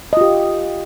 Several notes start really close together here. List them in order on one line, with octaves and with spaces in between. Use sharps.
D#5 F4 G4